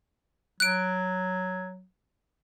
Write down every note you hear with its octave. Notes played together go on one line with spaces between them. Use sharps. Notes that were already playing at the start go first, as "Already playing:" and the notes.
F#3 F#6 D7